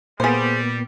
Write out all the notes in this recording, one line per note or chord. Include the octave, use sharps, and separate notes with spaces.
A#2 G3 A#3 B3 G#4 C5